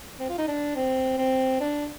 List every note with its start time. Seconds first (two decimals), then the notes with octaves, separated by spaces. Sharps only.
0.19 C4
0.29 F4
0.38 D#4
0.48 D4
0.75 C4
1.18 C4
1.60 D4